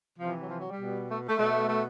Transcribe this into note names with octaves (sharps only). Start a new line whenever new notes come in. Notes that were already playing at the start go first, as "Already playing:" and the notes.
C3 E3 F3
F#3
F3
F#3
G3
B2
A3
A3
B2 A3
A3